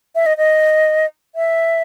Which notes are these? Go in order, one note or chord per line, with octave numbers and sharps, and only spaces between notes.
E5
D#5
D#5
E5